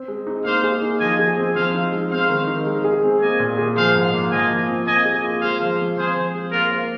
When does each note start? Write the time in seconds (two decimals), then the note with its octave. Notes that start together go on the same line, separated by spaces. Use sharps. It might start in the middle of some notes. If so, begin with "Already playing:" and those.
Already playing: C4
0.08 G#3
0.27 D#4
0.44 A#3 C5 F5
0.64 G#4
0.82 D#4
1.00 F3 D#5 G#5
1.19 G#4
1.37 C4
1.55 F3 C5 F5
1.74 D#4
1.92 G#3
2.11 C4 C5 F5
2.29 D#3
2.47 D#4
2.66 G#3
2.84 G#4
3.03 C4
3.21 A#3 D#5 G#5
3.39 A#2
3.58 G#4
3.76 F3 C5 F5
3.95 G#2
4.13 A#3
4.31 F3 D#5 G#5
4.50 F4
4.68 C4
4.86 A#3 D#5 G#5
5.05 G#4
5.24 F4
5.41 G#3 C5 F5
5.60 F3
5.79 C4
5.97 F3 G#4 C5
6.16 C4
6.34 G#3
6.52 A#3 F4 A#4
6.71 C5